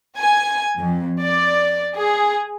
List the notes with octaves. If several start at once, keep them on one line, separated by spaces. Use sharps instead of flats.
G#5
F2
D5
G#4